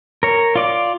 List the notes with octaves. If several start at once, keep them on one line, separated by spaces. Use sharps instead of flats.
A#4 C#5
F4 D5 D6